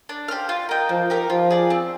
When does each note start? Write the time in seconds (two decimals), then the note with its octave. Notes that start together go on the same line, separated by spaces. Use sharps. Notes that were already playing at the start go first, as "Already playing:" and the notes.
0.09 D4
0.28 G4 C5 F5
0.49 F4
0.69 A#4 D#5 G5
0.89 F3 A#3
1.10 D#4 G4 A#4
1.30 F3 F4
1.50 G#4 D5
1.70 C4